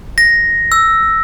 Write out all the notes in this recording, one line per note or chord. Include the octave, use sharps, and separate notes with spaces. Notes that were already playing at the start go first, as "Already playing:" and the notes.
A#6
E6